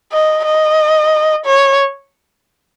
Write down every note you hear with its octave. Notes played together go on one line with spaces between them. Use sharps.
D#5
D#5
C#5